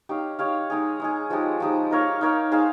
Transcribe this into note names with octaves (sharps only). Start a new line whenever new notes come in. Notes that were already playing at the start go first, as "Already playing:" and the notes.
D#4 G4 C#5 F5
D#4 G4 C#5 F5
G#3 D#4 G#4
G#3 D#4 G#4
F3 G#3 D#4 G4
F3 G#3 D#4 G4
D#4 A#4 C#5 F5
D#4 A#4 C#5 F5
D#4 G#4 C5 F5